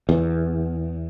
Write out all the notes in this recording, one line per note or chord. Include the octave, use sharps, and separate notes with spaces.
E2